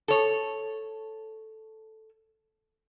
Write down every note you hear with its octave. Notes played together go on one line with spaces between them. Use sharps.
A4 C#5